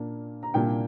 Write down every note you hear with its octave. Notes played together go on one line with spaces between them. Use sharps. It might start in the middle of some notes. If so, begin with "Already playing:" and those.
Already playing: A#2 A#3 D4
A#5
C2 A#2 A#3 D4 G5